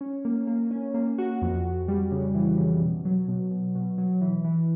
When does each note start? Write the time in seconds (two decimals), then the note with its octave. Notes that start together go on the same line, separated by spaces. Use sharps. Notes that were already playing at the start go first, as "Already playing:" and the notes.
0.01 C#4
0.25 A#3
0.47 A#3
0.71 C#4
0.94 A#3
1.18 F#4
1.42 F2
1.65 F2
1.88 G3
2.11 C#3
2.35 E3
2.58 C#3
2.81 B2
3.05 F#3
3.28 B2
3.51 B2
3.75 B2
3.98 F#3
4.21 E3
4.44 E3